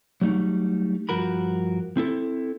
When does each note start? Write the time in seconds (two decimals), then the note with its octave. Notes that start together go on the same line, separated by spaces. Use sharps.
0.21 F#3 G3 A3 D#4
1.09 G2 F3 F#4 A#4 B5
1.97 C4 E4 A4